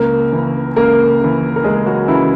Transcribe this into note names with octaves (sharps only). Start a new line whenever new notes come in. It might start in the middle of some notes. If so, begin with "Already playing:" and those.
Already playing: C#2 A#3 A#4
C#3 E3
C#2 A#3 A#4
C#3 E3
A#4
C#2 G#3 G#4
F#3 F#4
C#3 E3 E4